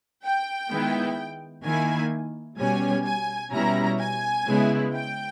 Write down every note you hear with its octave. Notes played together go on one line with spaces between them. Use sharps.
G5
D#3 G#3 B3 E4
D#3 A#3 E4 G#5
B2 G3 C#4 G#5
G#5
B2 G3 C#4 E4 A#5
G#5
C#3 G#3 B3 E4
G5